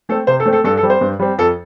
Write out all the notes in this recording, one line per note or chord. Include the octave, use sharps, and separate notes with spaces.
A3 C4 A4
C3 C5
A4
A3 C4
A4
G2 A4
A4
G3 C4
C5
G2
G3 C4
F2 A4